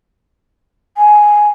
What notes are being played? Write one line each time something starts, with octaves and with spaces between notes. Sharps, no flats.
G#5